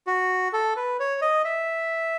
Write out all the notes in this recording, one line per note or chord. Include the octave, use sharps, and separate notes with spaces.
F#4
A4
B4
C#5
D#5
E5